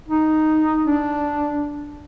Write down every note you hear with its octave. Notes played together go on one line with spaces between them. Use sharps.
D#4
D4